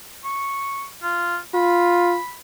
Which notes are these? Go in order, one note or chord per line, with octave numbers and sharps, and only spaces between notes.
C#6
F4
F4 B5